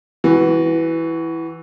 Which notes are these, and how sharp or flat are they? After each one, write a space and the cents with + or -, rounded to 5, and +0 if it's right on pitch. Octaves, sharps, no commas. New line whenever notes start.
E3 +0 F#4 +20